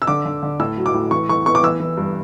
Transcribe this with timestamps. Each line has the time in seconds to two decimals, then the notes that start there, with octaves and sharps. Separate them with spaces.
0.02 E6
0.07 D3 D6
0.26 D3
0.43 D3
0.60 A2 E6
0.77 F#3
0.86 D6
0.94 A2
1.11 E3 C#6
1.29 E3 C#6
1.46 B3 C#6
1.55 D6
1.63 E3 E6
1.80 E3
1.97 G2